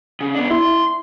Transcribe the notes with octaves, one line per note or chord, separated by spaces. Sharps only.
C#3
B3 D4
E4 C6